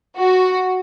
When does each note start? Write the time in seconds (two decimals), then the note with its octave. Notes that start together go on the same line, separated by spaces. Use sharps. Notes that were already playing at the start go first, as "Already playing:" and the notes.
0.19 F#4